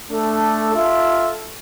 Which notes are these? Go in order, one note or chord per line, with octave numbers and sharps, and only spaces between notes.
A3 D4 A4
F4 A4 E5